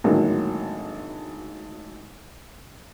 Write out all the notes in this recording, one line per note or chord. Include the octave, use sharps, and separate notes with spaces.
G#1 A2 D3 F#3 A#3